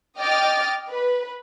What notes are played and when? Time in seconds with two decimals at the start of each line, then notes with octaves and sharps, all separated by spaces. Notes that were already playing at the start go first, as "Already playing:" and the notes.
0.18 D#5 G5 D6 F6 A6
0.90 B4